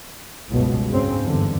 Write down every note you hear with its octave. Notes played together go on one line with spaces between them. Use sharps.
F#1 C#2 G2 B2
G#2 C#3 C4
E2 G2 D3